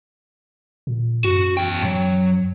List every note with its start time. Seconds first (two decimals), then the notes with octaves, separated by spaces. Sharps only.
0.87 A#2
1.24 F#2 F#4
1.57 E2 G5
1.85 F#3